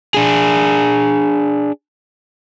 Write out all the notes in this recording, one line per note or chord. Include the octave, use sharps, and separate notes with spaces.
D4 G#4